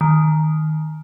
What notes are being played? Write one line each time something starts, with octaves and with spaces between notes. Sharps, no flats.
D#3